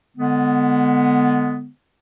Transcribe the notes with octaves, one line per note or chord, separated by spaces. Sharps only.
D3 G#3 B3